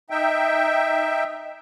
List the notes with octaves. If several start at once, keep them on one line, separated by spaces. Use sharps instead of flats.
D#4 E5 G5